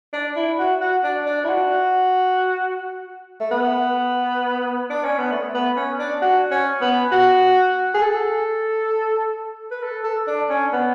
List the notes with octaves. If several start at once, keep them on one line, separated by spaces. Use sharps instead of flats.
D4
E4
F#4
F#4
D4
D4
E4
F#4
A3
B3
D4
C#4
B3
A3
B3
C#4
D4
F#4
C#4
B3
F#4
G#4
A4
B4
A4
A4
D4
C#4
B3